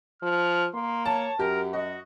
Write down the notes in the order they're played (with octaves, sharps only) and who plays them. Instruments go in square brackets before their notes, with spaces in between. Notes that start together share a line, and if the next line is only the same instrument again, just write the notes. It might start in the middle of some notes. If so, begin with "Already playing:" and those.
[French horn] F3 [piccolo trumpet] F6
[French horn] A#3 [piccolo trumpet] C6
[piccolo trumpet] C#5 [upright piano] A5
[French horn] F#2 [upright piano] G4 [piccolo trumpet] A#4
[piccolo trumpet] F#4 [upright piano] D#5